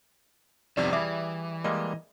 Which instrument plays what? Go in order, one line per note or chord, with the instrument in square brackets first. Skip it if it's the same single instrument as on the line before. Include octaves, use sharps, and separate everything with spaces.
[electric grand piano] C2 F2 C3 [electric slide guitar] D#3 F3 B3 [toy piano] D5
[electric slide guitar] E3 [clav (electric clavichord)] G3 G#4 [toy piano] E5 [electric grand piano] D6
[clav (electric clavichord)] G3 G#3 A#3 [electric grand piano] D#5